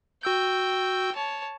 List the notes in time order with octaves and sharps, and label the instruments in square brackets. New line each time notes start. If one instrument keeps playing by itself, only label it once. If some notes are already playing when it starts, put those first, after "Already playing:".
[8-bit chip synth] F#4 E6 G6 [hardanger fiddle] G5
[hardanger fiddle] C#5 A5